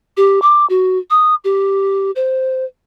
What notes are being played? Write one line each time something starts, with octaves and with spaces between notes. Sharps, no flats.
G4
D6
F#4
D#6
G4
C5